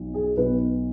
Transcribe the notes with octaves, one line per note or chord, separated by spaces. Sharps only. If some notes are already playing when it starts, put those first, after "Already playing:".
Already playing: B1 B2 B3 D#4
G#4
B1 B2 B3 D#4 B4